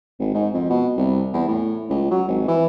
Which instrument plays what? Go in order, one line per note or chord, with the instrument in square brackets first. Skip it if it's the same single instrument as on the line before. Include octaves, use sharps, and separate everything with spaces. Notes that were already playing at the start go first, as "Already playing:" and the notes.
[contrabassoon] G#1
G#2
F2
B2
C2
E2
A2
C#2
F#3
G#1
E3